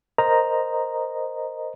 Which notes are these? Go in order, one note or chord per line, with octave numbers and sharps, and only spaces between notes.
A#4 C5 D#5 A#5